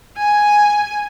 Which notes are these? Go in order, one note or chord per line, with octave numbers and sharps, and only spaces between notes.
G#5